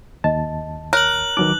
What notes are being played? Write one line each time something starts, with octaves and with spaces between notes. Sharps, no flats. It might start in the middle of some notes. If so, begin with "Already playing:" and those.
D#2 D#5 A5
A#4 C#5 F#6 F#7
D#3 F#3 D#4 B4 D6